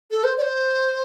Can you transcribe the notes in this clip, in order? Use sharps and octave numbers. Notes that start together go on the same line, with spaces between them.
A4
C5
D5
C5